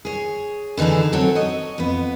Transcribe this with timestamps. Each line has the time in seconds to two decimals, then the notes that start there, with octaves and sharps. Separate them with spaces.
0.05 G#4 C#5
0.77 D3 E3 D#4 G#4 A4
1.13 F#3 C4 A4 C#5
1.35 C#5 D#5
1.78 F2 B3